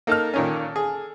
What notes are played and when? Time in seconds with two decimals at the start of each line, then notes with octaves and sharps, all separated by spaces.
0.07 A#3 D#4 A4 A5 F6
0.34 A#2 D#3 C#4
0.76 G#4